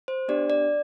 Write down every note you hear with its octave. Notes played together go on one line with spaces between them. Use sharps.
C5
B3 D4 G4 D5
D5